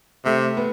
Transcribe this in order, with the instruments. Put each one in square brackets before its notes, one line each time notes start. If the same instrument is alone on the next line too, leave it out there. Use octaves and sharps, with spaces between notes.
[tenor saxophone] C3 [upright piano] A3
[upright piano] B3